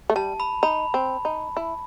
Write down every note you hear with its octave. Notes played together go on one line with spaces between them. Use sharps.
A3
G3 A5
B5
D#4 B5
C4
D#4
E4